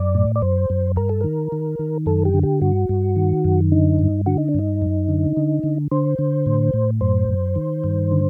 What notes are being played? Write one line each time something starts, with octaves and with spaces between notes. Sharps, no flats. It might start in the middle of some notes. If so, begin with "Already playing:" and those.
Already playing: F#2 D5
A2
D5
F#2 C5
F#2
G2 A#4
A4
D#3 A#4
D#3
D#3
F#2 A4
G4
D3
G4
G2 F#4
G2
D#3
F#2
D3 D#4
G2
D3 F#4
D#4
D4
G2 D#4
F#2
D3
D3
D3
D3 C5
D3
A2
A2
F#2 C5
F#2
D#3
G2
D3